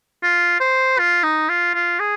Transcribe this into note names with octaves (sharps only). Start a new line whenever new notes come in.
F4
C5
F4
D#4
F4
F4
G#4